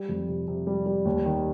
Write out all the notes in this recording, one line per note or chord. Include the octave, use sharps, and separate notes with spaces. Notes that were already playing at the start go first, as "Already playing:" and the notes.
Already playing: G3
F2
C3
C3
G3
G3
D#2
D#3